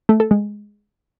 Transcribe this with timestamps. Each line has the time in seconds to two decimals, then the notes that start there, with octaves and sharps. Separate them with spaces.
0.09 A3
0.20 A4
0.31 G#3